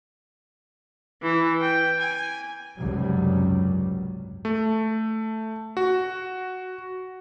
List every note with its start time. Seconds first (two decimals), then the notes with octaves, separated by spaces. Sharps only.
1.23 E3
1.61 G5
1.99 G#5
2.77 G#1 C#2 F#2 C3 F#3 G3
4.45 A3
5.77 F#4